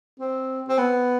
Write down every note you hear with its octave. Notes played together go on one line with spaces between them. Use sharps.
C4
C4
B3